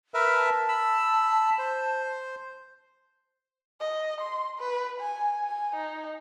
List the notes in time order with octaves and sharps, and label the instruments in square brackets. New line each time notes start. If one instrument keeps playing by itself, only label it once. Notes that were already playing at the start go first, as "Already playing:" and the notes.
[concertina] A#4 B4 E5
[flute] A5
[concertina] B5 E6
C5
[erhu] D#5
C6
B4
G#5
G#5
D#4